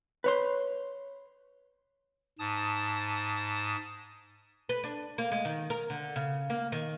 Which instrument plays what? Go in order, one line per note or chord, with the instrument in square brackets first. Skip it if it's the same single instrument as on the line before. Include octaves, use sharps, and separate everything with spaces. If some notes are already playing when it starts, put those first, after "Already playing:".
[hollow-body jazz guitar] B4 C#5 C6
[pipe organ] G#2 A5 D#6
[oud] B4
D4
A#3
G#3
D#3
A#4
D3
C#3
A#3
D#3